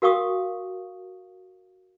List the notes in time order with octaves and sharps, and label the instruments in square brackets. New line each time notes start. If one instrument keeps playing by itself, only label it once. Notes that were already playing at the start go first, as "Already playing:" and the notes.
[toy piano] F#4 A#4 F5 G5 C#6 D#6